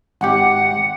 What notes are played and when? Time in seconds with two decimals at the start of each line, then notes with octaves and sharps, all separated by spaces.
0.21 G#1 G4 F#5